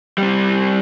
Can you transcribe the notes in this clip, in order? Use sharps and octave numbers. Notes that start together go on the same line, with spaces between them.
G3 C4